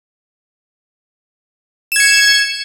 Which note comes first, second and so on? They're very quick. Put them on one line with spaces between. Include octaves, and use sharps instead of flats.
E7 G#6 C#7